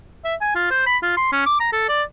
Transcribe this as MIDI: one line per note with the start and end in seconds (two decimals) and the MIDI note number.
0.24 0.35 76
0.41 0.51 80
0.55 0.66 65
0.71 0.81 72
0.86 0.96 83
1.03 1.15 65
1.17 1.31 84
1.32 1.42 61
1.46 1.59 86
1.60 1.72 82
1.72 1.86 69
1.89 2.02 74